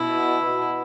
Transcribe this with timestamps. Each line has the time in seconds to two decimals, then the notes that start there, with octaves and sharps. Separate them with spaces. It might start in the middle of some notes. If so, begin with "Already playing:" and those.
Already playing: B2 E4
0.43 B2